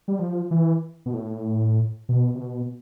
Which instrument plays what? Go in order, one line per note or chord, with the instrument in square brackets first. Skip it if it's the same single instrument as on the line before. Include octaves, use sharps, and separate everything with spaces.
[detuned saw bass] G3
F3
E3
B2
A2
B2
C3
B2